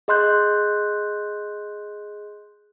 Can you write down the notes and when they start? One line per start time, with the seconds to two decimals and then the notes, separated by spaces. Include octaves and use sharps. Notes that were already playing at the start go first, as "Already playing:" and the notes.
0.08 G#4 D#5 C6 F#6 G6